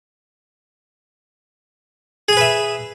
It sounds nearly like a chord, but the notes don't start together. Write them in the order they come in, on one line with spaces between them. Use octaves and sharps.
G#4 G#5 B4 E5